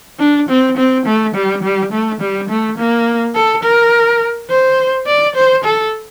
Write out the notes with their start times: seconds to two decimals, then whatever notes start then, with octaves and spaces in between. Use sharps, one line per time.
0.19 D4
0.49 C4
0.77 C4
1.06 A3
1.35 G3
1.63 G3
1.92 A3
2.21 G3
2.49 A3
2.78 A#3
3.35 A4
3.63 A#4
4.50 C5
5.07 D5
5.35 C5
5.64 A4